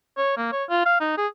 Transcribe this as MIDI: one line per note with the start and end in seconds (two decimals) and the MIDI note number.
0.18 0.34 73
0.37 0.49 58
0.52 0.64 73
0.70 0.85 65
0.86 0.97 77
1.00 1.17 63
1.18 1.27 68